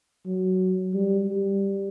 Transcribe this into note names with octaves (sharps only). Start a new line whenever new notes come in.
F#3
G3
G3